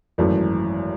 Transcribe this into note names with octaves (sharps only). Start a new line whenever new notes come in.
G#1 F#2 E3 A3